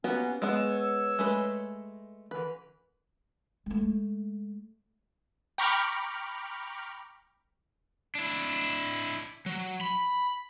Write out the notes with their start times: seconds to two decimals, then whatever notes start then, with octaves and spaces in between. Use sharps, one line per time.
0.04 F#3 A#3 B3 C#4 F#4 G4
0.42 G#3 B3 C#5 E6
1.19 G#3 A3 B4
2.31 F#2 D3 E3 B4
3.66 G#3 A3
5.58 G5 A#5 B5 C#6 D6 F6
8.15 D4 E4
9.46 F#3
9.81 B5